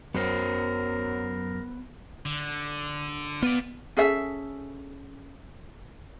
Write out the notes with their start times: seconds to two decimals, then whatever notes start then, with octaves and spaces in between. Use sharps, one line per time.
0.14 F#2 F#3 B3 A#4 C5
2.26 D3
3.43 B3 F4 D5
3.97 C#4 G#4 A4 E5